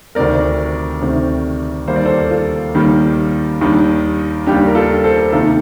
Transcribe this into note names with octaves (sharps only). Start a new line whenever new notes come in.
D2 C3 D#3 A3 C4 A#4 D5
D2 C3 D#3 A3 C4
D#2 D#3 G3 A#3 C5
D5
A4 C5
F4 A4
D#2 D#3 G3 A#3
D#2 D#3 G3 D4
D#2 D#3 G3 D4 G4
A#4
F4 A4
A4 C5
C3 D#3 A#3 D#4 F4 A4